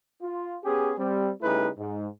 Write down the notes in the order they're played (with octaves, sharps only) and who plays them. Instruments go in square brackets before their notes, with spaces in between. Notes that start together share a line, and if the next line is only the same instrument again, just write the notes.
[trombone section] F4
B3 C#4 G4 G#4
G3 C4
C#3 G3 A3 D#4 E4 B4
G#2